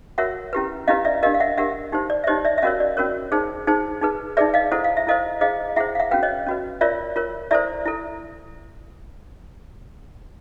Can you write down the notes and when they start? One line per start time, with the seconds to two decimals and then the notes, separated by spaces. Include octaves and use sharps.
0.18 F#4 A#4 C#5 E5 F#5
0.53 C#4 E4 G4 B4
0.87 C#4 E4 G4 B4 D#5 F5
1.05 D5 E5
1.23 D4 G4 A#4 D#5 F5
1.34 F5
1.40 E5 F#5
1.57 D4 G4 A#4 E5 F#5
1.92 D#4 G4 C5
2.10 D5
2.24 E5
2.27 D#4 G4 C5 C#5 D#5
2.45 D5 E5
2.58 E5
2.62 C#4 F#4 A#4 C#5 D#5 F5
2.80 D5
2.97 C#4 F#4 A#4 C#5
3.32 D#4 G#4 C5
3.67 D#4 G#4 C5
4.01 D#4 G#4 B4
4.37 D#4 G#4 B4 D5 E5
4.54 D#5 F5
4.72 E4 A4 C5 F#5
4.84 F5
4.97 E5
5.07 E4 A4 C5 D#5 F5
5.41 E4 G#4 C5 D#5 F5
5.76 E4 G#4 C5 E5 F#5
5.95 F5
5.99 E5 F#5
6.11 C#4 F#4 B4 F5 G5
6.23 C#5 D#5
6.47 C#4 F#4 B4
6.81 F4 A#4 C#5 D5 E5
7.16 F4 A#4 C#5
7.51 E4 A4 C5 D5 E5
7.86 E4 A4